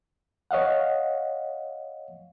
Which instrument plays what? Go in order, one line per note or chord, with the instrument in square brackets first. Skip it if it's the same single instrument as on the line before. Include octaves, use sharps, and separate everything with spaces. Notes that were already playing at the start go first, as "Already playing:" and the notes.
[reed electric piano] C#5 D#5 F5 F#5